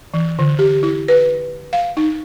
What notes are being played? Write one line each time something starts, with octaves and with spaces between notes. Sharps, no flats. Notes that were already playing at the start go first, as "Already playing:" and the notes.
E3
D3
G4
E4
B4
F5
D#4